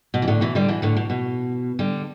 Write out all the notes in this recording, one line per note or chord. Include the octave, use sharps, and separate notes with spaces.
B2
E3
A2 D3
B2 E3
D3 G3
B2 E3
A2 D3
B2
B2
D3 G3